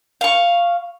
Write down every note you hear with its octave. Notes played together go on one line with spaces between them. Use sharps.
F5 C#6